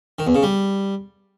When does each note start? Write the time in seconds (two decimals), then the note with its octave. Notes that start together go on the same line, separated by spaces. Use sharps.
0.19 D#3
0.27 E2
0.35 C#3
0.43 G3